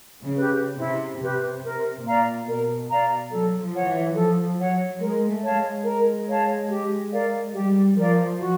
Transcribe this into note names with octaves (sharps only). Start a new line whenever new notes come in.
C#3
G4 B4
C3 E4
C3 G4 B4
C3 A#4
A#2 D5 F5 A#5
B2 A#4
D5 F5 A#5
F#3 A4
F3
C#5 F#5
E3
F3 A4
F#3 C#5 F#5
G#3 A#4
A3
C#5 F5 A5
G#3
A#4
C#5 F5 A5
G4
A#4 D5 F5
G3 G4
F3 A#4 D5 F5
F#4